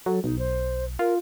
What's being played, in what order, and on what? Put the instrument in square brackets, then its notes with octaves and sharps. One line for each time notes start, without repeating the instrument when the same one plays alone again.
[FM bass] F#3 [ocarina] A4
[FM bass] B1 [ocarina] D#4
[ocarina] C5
[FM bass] F4 [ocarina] A#4